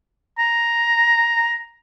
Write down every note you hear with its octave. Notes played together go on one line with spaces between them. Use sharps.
A#5